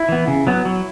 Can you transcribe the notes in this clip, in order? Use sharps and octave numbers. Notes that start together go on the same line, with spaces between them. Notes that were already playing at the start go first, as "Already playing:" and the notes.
Already playing: E4
E3 B3
C#3
F#3 B3
F#3